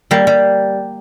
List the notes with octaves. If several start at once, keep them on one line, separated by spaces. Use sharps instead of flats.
G3 A#3
G3